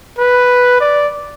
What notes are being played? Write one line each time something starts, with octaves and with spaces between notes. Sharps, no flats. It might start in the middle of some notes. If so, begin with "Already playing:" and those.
B4
D5